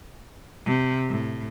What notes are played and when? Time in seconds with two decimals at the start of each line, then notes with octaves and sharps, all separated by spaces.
0.65 C3
1.09 A2